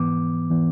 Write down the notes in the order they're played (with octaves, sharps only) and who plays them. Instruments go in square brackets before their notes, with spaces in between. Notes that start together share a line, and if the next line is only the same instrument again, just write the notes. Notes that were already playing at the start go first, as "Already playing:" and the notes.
Already playing: [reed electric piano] G#2 E3 B3 D6
E3 B3